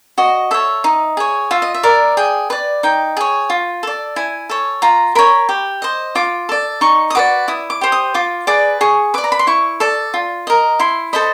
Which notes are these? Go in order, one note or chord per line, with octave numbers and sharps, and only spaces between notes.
F#4 D#5
A4 C#5 E5
D#4
G#4 C#5
F4 E5
D#5
E5
A#4 D5
G#4 G5
B4 D5
D#4 G5
G#4 C#5
F4
A4 D5
E4 G#5
A4 C#5
F4 A#5
A#4 C#5 B5
G4
C5 D#5
F4 D6
A4 D5
D#4 C#6
D#6
F#4 B4 D5 D6
E4 D#6
D6
G4 C5
D#6
F4 D6
G#4 B4 D5 D6
G#4 C#6
B4 D5 D6
A#5
B5
C6
E4 C#6
A4 D5
F4
A#4 D#5
E4 C6
A4 C5 D#5 B5